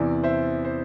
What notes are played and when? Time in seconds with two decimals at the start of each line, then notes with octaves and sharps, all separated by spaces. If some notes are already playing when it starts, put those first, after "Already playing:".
Already playing: E2 C3 E3 D5
0.24 C5 E5
0.65 C5